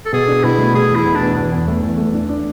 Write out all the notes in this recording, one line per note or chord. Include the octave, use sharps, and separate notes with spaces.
A4
B2 G#4
D4
B2 E4
A3
A3 G#4
E2
E4
B2
D4
E2
E2
E2
A3
E2
A3
D4
D4